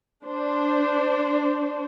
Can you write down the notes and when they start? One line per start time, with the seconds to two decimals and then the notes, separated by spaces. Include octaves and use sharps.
0.24 D4 C5